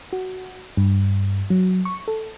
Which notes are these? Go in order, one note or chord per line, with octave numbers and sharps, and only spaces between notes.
F#4
G2
F#3
C#6
A4